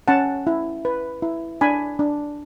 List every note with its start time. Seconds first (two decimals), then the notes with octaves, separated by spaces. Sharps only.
0.08 C#4 F#5 A5
0.47 E4
0.85 B4
1.22 E4
1.61 D4 G#5 B5
1.99 D4